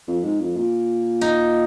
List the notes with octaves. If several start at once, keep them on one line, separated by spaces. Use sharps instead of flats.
F2
G#2
F2
A#2
D#4